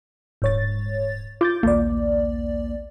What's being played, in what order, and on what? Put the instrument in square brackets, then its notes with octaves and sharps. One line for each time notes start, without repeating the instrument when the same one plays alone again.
[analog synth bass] D#1 [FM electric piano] G#2 C#5 A6
[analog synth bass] F4 [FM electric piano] D6 G6 A6
[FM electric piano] A#1 D#2 D5 [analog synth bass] A#3